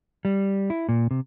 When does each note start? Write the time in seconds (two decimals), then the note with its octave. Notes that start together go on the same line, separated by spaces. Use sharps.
0.25 G3
0.70 E4
0.89 A#2
1.11 C3